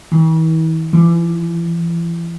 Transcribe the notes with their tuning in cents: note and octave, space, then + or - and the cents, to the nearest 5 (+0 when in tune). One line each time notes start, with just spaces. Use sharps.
E3 -40
E3 +40